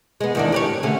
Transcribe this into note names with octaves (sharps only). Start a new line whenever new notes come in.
G#3 B3
E2 D#3 D4
G4 B4 C#5
D3 A3 C#4